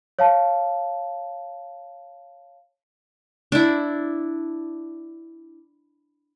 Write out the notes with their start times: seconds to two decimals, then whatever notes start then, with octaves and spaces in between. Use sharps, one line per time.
0.19 C#5 F5 A5
3.52 D4 E4